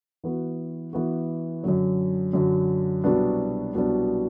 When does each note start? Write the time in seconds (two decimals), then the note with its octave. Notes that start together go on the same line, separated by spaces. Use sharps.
0.24 E3 B3 F#4
0.93 E3 B3 F#4
1.64 F#2 D3 F#3
2.33 F#2 D3 F#3
3.04 C2 B2 F#3 B3 D4
3.74 C2 B2 F#3 B3 D4